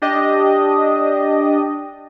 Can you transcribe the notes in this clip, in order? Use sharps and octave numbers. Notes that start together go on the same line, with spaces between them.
D4 G4 D#5